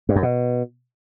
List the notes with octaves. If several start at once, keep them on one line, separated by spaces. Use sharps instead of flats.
G2
F#2
B2